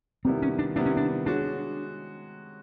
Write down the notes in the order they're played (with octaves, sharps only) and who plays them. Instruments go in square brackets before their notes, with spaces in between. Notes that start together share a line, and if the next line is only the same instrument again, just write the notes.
[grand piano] C3 D#3 G3 B3 E4 [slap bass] C4
[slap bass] C#4
D4
[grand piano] C3 D#3 G3 B3 E4 [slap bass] D4
[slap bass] C#4
D4
[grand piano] G#3 C#4 F#4 [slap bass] D4